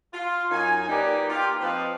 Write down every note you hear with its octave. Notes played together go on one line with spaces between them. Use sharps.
F4
F#2 D#4 G#5
A#3 D#4 G4 B4 D5
F4 G4
F3 C4 B4 D#5 F5